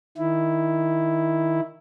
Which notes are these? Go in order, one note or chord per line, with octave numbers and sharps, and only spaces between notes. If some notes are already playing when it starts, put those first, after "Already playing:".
D#3 E4